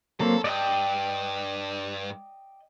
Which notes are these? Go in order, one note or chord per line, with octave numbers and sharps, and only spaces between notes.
F#3 A#3 C4 A4
G2 D5 D#5 G5